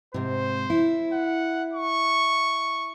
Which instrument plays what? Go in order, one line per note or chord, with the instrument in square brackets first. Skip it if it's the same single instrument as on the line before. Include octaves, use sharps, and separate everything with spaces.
[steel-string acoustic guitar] G#2 C3 [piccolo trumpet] C5
[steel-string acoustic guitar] E4
[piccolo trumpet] F#5
C#6